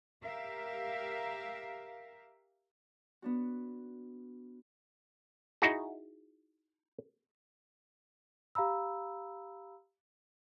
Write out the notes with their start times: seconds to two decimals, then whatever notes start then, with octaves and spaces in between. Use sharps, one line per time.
0.23 G4 A#4 E5 F5
3.22 B3 D4 F#4
5.62 D#4 E4 F#4 G#4
8.55 G4 F5 A#5 B5 E6